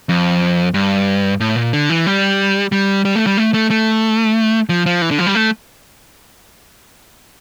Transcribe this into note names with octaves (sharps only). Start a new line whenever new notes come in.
F2
G2
A2
A#2
D3
E3
G3
G3
G3
A3
G3
A3
A3
A3
F3
F3
E3
D3
F3
G3
A3